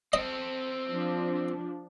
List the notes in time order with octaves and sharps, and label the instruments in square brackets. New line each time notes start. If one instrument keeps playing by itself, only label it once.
[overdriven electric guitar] C4 A4 [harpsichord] D#5
[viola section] F3 D4